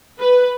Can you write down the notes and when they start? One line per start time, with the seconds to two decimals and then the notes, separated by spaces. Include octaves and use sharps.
0.19 B4